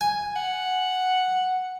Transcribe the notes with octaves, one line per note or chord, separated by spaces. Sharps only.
G#5
F#5